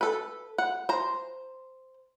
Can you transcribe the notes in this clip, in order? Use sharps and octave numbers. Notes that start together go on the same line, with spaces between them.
A4 B4
F#5
C5 A#5